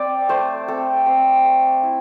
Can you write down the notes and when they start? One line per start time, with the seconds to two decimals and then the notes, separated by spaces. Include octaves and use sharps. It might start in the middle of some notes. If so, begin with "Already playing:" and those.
Already playing: C4 D5
0.29 A3 C5
0.68 C4 A4
1.06 C4
1.44 A3
1.83 E4